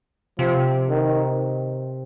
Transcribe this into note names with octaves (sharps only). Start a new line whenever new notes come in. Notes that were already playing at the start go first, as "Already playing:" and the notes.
C3 F3
D#3